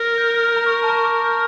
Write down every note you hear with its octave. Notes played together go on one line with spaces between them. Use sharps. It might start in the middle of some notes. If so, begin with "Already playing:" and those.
Already playing: A#4
G6
F6
A#5
C#6
A5
A#5
C#6
D6
G6
F6